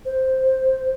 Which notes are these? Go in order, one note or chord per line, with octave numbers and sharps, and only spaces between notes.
C5